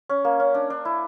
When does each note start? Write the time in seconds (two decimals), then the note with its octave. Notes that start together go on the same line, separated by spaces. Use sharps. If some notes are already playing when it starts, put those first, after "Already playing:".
0.09 C#4
0.25 A#3
0.40 C#4
0.55 D4
0.70 D4
0.85 E4